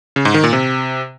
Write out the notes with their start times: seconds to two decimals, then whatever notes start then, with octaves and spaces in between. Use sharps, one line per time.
0.16 C#3
0.25 G#2
0.34 D#3
0.44 A#2
0.53 C3